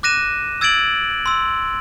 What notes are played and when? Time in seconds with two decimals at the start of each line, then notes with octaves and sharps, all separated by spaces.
0.03 D6 F#6 A#6 D#7 E7
0.61 E6 G#6 A6 D7 F#7
1.26 C6 E6